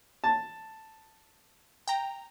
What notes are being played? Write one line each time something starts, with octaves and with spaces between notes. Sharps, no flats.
A5
G5 A#5